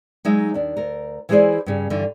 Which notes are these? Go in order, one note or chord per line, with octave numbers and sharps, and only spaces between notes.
F#3 G#3 D#4 E5
D#2 D4
D2 A#4
E3 G#3 E4 G#4 C5 D5
G2 C#3
G2 D3 E3